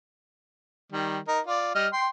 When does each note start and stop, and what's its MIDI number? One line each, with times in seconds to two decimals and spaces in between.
0.92 1.19 51
0.92 1.19 55
1.28 1.40 63
1.28 1.40 70
1.47 1.71 65
1.47 1.71 74
1.75 1.87 55
1.75 1.87 75
1.75 1.87 89
1.93 2.08 79
1.93 2.08 84